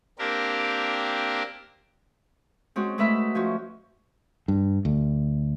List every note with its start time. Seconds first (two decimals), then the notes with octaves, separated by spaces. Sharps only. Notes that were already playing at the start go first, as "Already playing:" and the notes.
0.19 A#3 C4 D4 G4 A#4
2.76 G#3 C4 C#4 F#4
2.98 G#3 A3 B4 E5 B5
3.35 F3 C#4 F#4
4.48 G2
4.85 D2